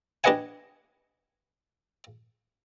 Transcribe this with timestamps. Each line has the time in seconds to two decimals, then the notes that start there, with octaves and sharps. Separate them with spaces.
0.24 D4 G4 B4 D#5 F#5 G#5